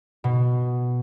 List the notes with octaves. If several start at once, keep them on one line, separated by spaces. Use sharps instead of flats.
B2